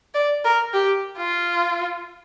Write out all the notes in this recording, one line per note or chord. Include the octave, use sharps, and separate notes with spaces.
D5
A#4
G4
F4